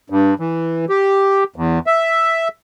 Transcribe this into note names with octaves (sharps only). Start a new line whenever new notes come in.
G2
E3
G4
E2
E5